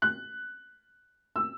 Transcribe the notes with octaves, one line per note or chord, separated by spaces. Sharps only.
F#6
E6